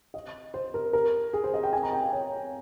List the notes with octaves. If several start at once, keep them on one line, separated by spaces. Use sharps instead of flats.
D#5
C5
A#4
A#4
G#4
C5
D#5
G5
G#5
A#5
G5
F5
C#5